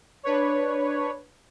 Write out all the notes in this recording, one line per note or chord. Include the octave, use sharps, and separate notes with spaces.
D4 B4 C#5